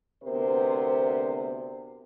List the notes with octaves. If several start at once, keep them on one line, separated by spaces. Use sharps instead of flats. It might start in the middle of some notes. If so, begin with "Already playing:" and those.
D2 C3 B3 A#4 C5